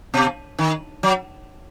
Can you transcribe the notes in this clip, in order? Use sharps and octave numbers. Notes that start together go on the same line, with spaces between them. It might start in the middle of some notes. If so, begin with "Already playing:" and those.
B2
D#3
F#3